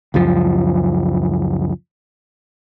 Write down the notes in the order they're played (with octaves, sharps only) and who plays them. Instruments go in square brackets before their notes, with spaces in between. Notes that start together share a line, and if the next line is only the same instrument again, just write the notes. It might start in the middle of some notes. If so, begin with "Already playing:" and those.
[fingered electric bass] C#2 F#2 F3